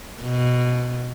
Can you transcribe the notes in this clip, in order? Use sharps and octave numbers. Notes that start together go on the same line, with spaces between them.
B2